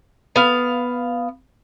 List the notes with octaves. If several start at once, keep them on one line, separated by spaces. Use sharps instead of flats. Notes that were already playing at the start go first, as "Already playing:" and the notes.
B3 F5